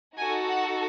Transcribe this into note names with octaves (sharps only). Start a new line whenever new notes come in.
D#4 F#4 A4 G#5
F#5